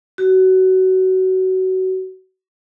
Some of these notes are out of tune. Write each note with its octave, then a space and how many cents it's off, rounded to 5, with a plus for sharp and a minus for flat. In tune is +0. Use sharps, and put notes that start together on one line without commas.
F#4 +25